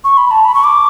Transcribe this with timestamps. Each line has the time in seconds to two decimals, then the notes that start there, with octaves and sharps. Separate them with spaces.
0.04 C#6
0.17 B5
0.31 A5
0.45 B5
0.55 C#6
0.64 D6